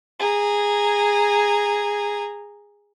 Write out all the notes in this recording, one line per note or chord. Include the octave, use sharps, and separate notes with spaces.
G#4 A#5